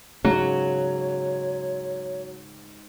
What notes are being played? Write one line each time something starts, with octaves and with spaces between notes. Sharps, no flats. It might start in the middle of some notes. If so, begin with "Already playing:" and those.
G#2 C#3 F#3 C#5